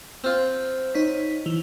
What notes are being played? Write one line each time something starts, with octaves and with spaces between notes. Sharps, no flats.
C4 F4
D#4 C#5 B6
E3